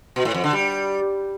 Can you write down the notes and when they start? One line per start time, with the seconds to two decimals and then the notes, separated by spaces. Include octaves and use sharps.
0.16 B2
0.25 A2
0.34 F2
0.44 D3
0.53 G3